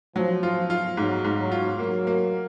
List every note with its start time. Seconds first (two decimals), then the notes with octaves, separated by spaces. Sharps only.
0.15 F3 F#3
0.43 F4
0.70 F4
0.97 G#2 F#3
1.24 G#2
1.38 F#3
1.51 F4
1.79 F#3 A#3
2.07 A#3